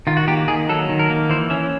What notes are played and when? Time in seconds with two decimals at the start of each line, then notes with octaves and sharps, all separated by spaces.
0.07 D#3 F4
0.17 F#4
0.28 A#3 G4
0.48 D#3 G#4
0.69 F#3 A4
0.89 D#3
0.99 A#4
1.10 A#3
1.29 E3 C5
1.50 C#4 E5